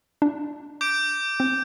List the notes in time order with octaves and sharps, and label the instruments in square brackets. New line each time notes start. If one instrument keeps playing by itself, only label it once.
[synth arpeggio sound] D4
[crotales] D6 G6 D7
[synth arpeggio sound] C4